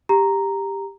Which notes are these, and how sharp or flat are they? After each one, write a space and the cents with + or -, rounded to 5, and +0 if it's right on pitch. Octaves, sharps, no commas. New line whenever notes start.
G4 +10 A#5 +0